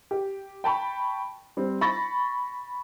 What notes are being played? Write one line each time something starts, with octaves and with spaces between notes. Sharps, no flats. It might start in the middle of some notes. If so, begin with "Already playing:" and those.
G4
G5 A5 B5 C#6
G3 C4
B5 C#6 A6 A#6